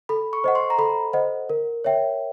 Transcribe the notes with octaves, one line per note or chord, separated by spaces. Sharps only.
A4 B5
C#6
C5 D#5 F#5
C6
A#5
A4 B5
C5 D#5 F#5
A#4
C#5 E5 G5